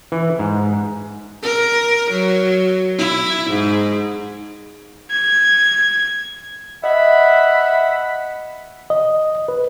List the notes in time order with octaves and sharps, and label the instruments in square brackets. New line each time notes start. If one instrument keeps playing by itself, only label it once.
[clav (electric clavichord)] E3
G#2
[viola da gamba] A#4
F#3
E4
G#2
[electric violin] G#6
[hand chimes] D#5 [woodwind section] E5 F#5 B5
[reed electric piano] D#5
B4